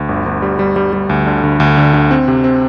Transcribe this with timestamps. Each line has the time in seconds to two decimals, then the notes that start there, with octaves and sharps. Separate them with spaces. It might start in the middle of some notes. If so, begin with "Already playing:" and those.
Already playing: D2
0.09 G1
0.26 G1
0.42 G3
0.59 G3
0.76 G3
0.93 G3
1.09 D2
1.27 D3
1.44 D2
1.60 D2
1.77 D3
1.94 D3
2.11 C4
2.28 C3
2.44 C4